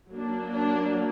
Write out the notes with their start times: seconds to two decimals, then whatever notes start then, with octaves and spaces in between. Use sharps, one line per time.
0.11 F#3 A#3 D4
0.52 D4